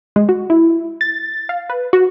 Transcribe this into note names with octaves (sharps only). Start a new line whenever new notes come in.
G#3
F#4
E4
A6
F5
B4
F#4